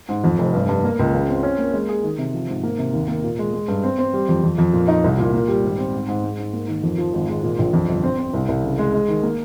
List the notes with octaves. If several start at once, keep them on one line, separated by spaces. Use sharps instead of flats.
G#2
F2
F1
G2
G2
A#3
C#2
C#3
C4
C#4
A#3
G#3
G#4
D#3
C3
F3
G#2
A#3
C3
D#2
A#3
A#2
G#3
G#3
G2
C4
C4
G3
F2
F2
F2
A#2
D#4
C2
A#2
A#3
G3
G#1
C4
G#2
G#2
G#3
G#2
A#3
D#3
F2
F3
G#1
G#3
A#2
A#1
F2
G1
C4
C4
C2
C2
C#3
G#3
G#3
D#3
A#3